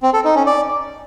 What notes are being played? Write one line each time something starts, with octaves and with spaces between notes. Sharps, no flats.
C4
A4
D#4
C#4
D5